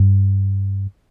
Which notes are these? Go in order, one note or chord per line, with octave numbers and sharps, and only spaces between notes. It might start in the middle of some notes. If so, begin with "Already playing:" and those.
Already playing: G2